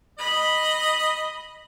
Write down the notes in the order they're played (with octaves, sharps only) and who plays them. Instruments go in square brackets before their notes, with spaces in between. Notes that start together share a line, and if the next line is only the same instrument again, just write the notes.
[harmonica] D#5 [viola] B5